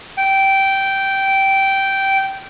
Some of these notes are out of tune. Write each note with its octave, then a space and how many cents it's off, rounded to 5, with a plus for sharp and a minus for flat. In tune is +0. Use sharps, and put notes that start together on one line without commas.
G5 -10